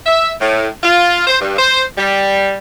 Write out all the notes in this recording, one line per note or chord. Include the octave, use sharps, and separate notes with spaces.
E5
A2
F4
C5
G2
C5
G3